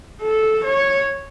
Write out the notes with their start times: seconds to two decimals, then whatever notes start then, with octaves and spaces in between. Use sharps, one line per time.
0.22 A4
0.64 C#5